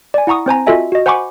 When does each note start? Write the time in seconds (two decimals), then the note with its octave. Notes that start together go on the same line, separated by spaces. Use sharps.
0.14 D5 G#5
0.27 E4 F#5 A#5 C#6 D#6
0.46 C4 C5 G#5 A#5
0.67 F4 F#4 A4 D#5 E5 G#5
0.92 F#4 D#5
1.06 C5 F#5 G#5 B5 C#6 D6